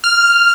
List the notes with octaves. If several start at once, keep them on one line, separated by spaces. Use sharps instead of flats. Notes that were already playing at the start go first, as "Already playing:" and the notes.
F6